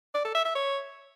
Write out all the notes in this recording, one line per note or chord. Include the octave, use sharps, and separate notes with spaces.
D5
A4
E5
E5
C#5